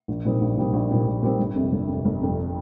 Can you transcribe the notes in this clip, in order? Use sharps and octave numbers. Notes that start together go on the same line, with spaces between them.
A#1
A#2 G3 C4 D#4
A#1
A#2 G3 C4 D#4
A#1
A#2 G3 C4 D#4
A#1
A#2 G3 C4 D#4
G1
F2 C3
G1
F2 C3
G1
F2 C3